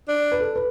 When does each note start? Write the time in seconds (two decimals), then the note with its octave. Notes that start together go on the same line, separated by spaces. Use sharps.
0.08 D4
0.32 B4
0.40 A4
0.56 B4